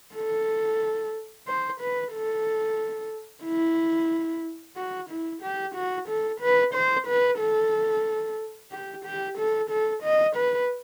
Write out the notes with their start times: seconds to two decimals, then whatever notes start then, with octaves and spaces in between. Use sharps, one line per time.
0.15 A4
1.47 C5
1.81 B4
2.13 A4
3.44 E4
4.77 F#4
5.10 E4
5.43 G4
5.75 F#4
6.09 A4
6.41 B4
6.74 C5
7.07 B4
7.40 A4
8.72 G4
9.05 G4
9.38 A4
9.70 A4
10.04 D#5
10.36 B4